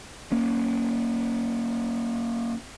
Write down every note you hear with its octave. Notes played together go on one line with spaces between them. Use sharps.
A#3 C#4